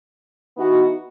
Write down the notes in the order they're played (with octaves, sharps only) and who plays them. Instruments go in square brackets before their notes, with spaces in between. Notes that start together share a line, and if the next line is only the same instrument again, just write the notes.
[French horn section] E3 B3 D#4 F#4